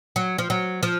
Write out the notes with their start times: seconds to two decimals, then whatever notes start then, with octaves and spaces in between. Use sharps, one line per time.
0.16 F#3
0.38 F3
0.50 F#3
0.83 F3